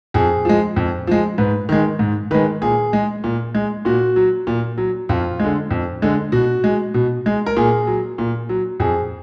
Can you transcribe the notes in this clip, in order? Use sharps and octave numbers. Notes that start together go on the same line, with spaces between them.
F2 G#4
F3 G#3
F2
F3 G#3
G#2 B4
D#3 G#3
G#2
D#3 G#3 B4
A#2 G#4
G#3
A#2
G#3
A#2 F#4
F#3
A#2
F#3
F2 F4
D3 G#3
F2
D3 G#3
B2 F#4
G#3
B2
G#3
A#4
A#2 G#4
F#3
A#2
F#3
F2 G#4